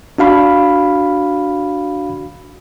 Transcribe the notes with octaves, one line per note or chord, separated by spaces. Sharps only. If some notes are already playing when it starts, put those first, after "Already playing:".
D4 F#4 F5 B5